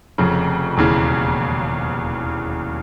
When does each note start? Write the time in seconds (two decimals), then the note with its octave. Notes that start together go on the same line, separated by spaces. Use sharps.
0.18 F1 F2 C#3
0.77 E1 D#2 C#3 E3